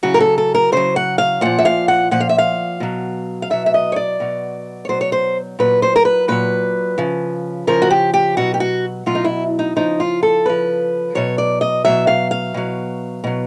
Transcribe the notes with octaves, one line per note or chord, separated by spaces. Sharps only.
C#3 F#3 F#4
A#4
A4
A4
A#4
C#3 F#3 C5
F#5
F5
A#2 F3 F#5
E5
F5
F#5
A#2 F3 F#5
F5
E5
F5
B2 F#3
F5
B2 F#3 E5
E5
D#5
C#5
D5
B2 F#3
C#5
B2 F#3 C5
C#5
C5
A#2 F#3 B4
C5
A#4
B4
A#2 F#3 B4
C#3 F3
C#3 F3 A#4
F#4
G4
G4
B2 F#3 F#4
G4
F#4
B2 F#3 F4
D#4
E4
D#4
C#3 F3 D#4
F4
A4
C#3 F3 B4
B2 F#3 C#5
D5
D#5
B2 F#3 E5
F5
F5
B2 F#3
B2 F#3